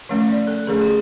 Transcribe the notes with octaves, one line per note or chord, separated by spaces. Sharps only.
D3 F3 A3 C#4
D5
A4
D3 F3 A3 C#4 G#4
G4